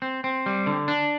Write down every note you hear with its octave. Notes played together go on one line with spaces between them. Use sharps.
C4
C4
G3
D3
D4